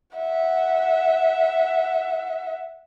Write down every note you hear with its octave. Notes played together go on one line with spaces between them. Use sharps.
E5 F#5